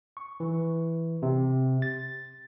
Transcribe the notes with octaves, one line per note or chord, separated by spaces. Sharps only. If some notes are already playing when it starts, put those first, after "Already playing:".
C#6
E3
C3
A6